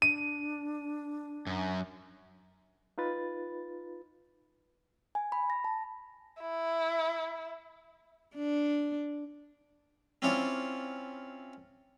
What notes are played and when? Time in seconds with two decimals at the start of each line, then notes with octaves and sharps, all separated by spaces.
0.02 D4 D#7
1.47 F#2
2.98 D#4 F4 B4 A6
5.15 G#5
5.32 B5
5.50 A#6
5.64 A5
6.41 E4
8.35 D4
10.22 C4 C#4 E4 F4 C#5 D5